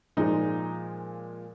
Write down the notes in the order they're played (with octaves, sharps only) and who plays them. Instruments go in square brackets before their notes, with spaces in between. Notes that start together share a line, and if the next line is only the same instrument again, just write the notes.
[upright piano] A#2 F3 G#3 D#4